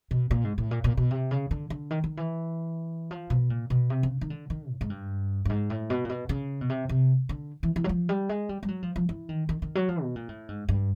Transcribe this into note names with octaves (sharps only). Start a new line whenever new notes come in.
B2
A#2
G#2
A2
A#2
A#2
B2
C3
C#3
D3
D3
D#3
D#3
E3
F3
B2
A#2
B2
C3
C#3
D#3
D3
D#3
A2
G#2
G2
G2
G#2
A2
B2
A#2
B2
C#3
B2
C3
C3
D3
E3
E3
F#3
F3
G3
G#3
G3
G3
F#3
F3
F3
E3
D#3
D#3
D#3
F#3
F3
B2
A#2
A2
G#2
G2